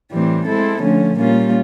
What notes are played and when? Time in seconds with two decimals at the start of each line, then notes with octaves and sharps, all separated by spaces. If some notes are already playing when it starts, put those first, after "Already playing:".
0.11 A2 E3 G3 C4
0.46 G#3 C4 E4 A4
0.82 D3 F3 A3 C#4
1.17 A#2 G3 A#3 C#4 F4